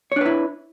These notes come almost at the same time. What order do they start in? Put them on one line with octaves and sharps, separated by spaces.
C#5 D4 B4 E4